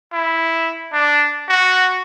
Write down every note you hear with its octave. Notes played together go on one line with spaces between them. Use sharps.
E4
D4
F#4